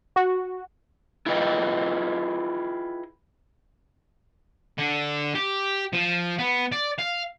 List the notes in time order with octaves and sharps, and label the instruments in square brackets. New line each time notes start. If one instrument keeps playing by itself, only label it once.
[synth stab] F#4
[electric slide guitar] E4 F4 G#4 B4 D#5 G5
[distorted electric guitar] D3
G4
F3
B3
D5
F5